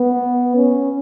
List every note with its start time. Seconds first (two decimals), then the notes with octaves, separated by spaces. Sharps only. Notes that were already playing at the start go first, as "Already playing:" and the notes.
Already playing: B3
0.56 C#4